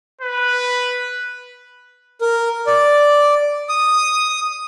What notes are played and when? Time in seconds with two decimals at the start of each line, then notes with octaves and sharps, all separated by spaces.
0.21 B4
2.21 A#4
2.66 D5
3.69 D#6